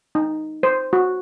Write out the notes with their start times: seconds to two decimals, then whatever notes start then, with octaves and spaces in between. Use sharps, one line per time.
0.15 D#4
0.63 C5
0.93 F#4